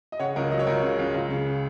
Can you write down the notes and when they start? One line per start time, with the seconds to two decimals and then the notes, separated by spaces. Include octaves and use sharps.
0.12 D#5
0.19 C#3 C#5 F#5
0.36 C#2 A#4 D#5
0.52 F#3 D#5
0.59 C#5
0.67 C#2 A#4 D#5
0.83 C#3
0.99 C#2
1.14 C#2
1.30 C#3